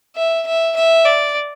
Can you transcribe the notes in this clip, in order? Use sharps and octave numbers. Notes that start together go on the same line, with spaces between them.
E5
E5
E5
D5